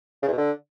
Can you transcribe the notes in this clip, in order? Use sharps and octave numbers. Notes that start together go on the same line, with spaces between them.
C#3
E2
B2
D3